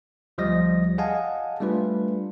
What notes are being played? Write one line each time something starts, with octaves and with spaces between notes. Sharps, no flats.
D2 F3 G3 D#5 A#6
G#4 D#5 F5 F#5 G#5 A5
G3 A3 D4 F4 B4